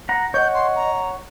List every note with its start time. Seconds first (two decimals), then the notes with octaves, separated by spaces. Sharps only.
0.09 F#5 A#5
0.34 C#5 D#5 F#5 G6
0.54 C6
0.76 A#5